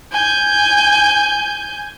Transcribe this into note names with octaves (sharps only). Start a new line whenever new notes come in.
G#5 G6